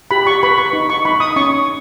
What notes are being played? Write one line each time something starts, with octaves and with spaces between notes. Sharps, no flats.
G4 B5
C#6
B4 B5
C#6
D#4
C#6
D#4 B5
D#6
C#4 C#6